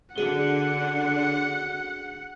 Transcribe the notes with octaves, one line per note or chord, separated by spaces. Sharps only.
D3 F#4 G#4 F#5 G7